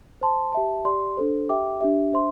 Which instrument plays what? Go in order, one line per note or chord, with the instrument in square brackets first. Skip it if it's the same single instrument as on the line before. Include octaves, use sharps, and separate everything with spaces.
[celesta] C5 A5 C6
G4 E5 A5
G4 D5 C6
D4 A4 C5
G4 E5 G5 D6
D4 G4 E5
D4 C5 E5 C6